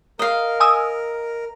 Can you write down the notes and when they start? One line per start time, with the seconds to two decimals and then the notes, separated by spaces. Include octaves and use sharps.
0.19 A#4 D#5 F5
0.60 G#5 D#6 E6